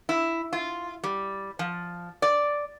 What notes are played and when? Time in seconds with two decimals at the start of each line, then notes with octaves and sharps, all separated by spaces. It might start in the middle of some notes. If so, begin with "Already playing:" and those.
0.09 E4
0.53 F4
1.04 G3
1.59 F3
2.22 D5